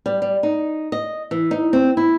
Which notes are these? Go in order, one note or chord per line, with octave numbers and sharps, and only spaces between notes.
G3
G3
D#4
D#5
E3
D#4
C4
E4